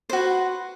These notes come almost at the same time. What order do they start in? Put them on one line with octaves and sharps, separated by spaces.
C5 F#4 B4